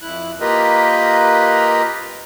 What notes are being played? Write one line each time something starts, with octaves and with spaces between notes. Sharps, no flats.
F2 E4 F#6
A#3 F4 G4 A#4 B4 D#5